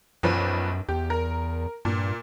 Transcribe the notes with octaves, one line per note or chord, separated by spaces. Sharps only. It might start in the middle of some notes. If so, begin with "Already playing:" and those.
B1 F#2 F3 B4
E2 G4
A#4
G2 A#2